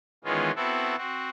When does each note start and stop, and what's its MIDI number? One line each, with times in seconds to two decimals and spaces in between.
0.24 0.51 51
0.24 0.51 52
0.24 0.51 56
0.24 0.51 59
0.24 0.51 61
0.24 0.51 65
0.56 0.96 59
0.56 0.96 60
0.56 0.96 64
0.56 0.96 66
0.56 0.96 69
0.97 1.30 60
0.97 1.30 66